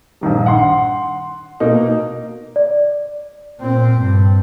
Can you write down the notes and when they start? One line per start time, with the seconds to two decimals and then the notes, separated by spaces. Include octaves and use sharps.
0.21 A#1 G2 D#3 G3
0.46 F#5 C6
1.60 B2 A#3 D#4
2.56 D5
3.60 A#2 C4
3.99 G2